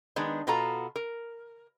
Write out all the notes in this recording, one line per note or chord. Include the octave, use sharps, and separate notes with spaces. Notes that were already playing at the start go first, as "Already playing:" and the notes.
D#3 G#3 B3 D4
B2 B3 F4 F#4 A4 A#5
A#4